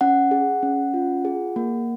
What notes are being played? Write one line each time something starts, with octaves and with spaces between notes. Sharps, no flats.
C#4 F#5
G#4
C#4
F4
G#4
A#3